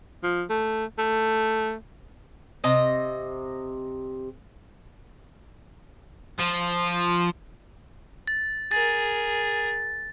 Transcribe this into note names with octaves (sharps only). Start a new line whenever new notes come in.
F3
A3
A3
C3 D#5
F3
A6
G#4 A#4 A6